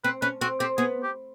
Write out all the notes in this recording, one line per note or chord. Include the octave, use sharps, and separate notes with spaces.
C4 B4
C#4 B4
C4 F#4
C4 G4
B3 G#4
G4